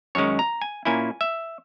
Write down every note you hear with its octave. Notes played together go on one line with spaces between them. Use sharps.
F#2 D#3 G#3 C#4 C#5
A#5
G#5
A#2 A#3 C#4 E4 G#5
E5